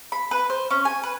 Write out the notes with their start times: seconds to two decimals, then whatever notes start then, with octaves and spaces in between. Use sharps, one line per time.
0.12 B5
0.31 B4
0.50 C5
0.70 C#4
0.85 G#5
1.03 B4